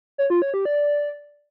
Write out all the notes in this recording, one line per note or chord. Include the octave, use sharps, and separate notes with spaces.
C#5
F4
C#5
G4
D5